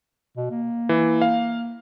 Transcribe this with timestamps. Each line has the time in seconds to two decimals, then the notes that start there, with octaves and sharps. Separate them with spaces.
0.36 B2
0.51 A#3
0.89 E3
1.22 F5